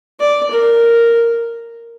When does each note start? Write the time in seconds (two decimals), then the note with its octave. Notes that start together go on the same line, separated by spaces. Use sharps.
0.20 D5
0.51 A#4